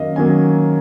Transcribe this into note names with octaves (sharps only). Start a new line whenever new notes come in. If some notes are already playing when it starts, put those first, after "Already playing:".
Already playing: F#2 D#3 F#3 A#3 D#5 F5
F#2 D#3 F#3 A#3 G#5